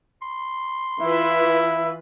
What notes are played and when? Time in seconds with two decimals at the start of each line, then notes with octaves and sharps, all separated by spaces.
0.22 C6
1.01 E3 E4 F4 B4 E5